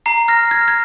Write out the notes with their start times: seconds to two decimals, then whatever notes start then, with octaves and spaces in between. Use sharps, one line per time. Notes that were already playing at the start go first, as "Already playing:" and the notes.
0.06 A#5 C7
0.28 F6 A#6
0.51 F6 G#6
0.68 G#6